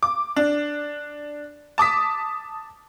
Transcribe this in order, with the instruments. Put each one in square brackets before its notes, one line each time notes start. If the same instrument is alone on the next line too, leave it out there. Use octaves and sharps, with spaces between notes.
[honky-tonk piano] D6
D4
A5 D6 D#6 B6